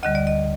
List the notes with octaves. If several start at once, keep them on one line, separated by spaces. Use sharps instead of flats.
D2 D3 G3 D#5
D5
D#5